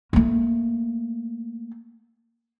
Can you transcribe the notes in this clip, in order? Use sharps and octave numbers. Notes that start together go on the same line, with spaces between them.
A3 A#3